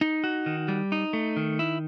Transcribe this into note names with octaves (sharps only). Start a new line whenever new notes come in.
D#4
F#4
D#3
G3
D#4
A3
D#3
E4